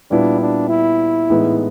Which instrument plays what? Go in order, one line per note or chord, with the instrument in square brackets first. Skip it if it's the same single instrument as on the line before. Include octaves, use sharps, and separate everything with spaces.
[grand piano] A#2 G3 B3 E4 [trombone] D4
[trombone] D4
E4
[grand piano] A2 E3 G#3 B3 D#4